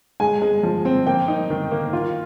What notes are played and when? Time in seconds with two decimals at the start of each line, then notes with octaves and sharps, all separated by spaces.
0.20 G#3 G#5
0.42 G#3
0.63 F3
0.85 C4
1.07 A#3 G5
1.28 D#4
1.50 D#3
1.71 A#3
1.93 F4